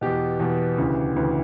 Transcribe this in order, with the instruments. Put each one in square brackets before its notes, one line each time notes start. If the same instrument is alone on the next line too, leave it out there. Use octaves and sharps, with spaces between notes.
[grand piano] E2 B2 G4
E2 B2
D2 C#3 E3
D2 C#3 E3